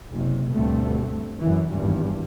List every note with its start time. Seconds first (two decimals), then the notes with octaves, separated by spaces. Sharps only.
0.11 F#1 C3
0.52 D2 G2 B2 A3 C4
1.41 F#2 E3
1.72 G#1 E2 G2